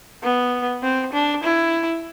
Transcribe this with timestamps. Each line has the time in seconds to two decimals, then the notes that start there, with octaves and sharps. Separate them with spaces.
0.23 B3
0.83 C4
1.13 D4
1.44 E4